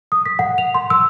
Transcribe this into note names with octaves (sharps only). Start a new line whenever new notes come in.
D#6
B6
F#5
F7
C6
E6